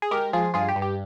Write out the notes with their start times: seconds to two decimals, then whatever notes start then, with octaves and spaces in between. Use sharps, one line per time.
0.02 G#4
0.11 G#3 G4 A#4
0.33 F3 F4 G#4
0.54 G2 F4 G#4
0.69 G4
0.76 G2
0.82 G4